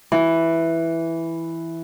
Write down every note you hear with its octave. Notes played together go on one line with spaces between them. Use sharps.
E3